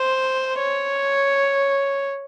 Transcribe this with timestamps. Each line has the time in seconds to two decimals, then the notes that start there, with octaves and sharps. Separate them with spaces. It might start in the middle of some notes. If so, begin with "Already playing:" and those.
Already playing: C5
0.60 C#5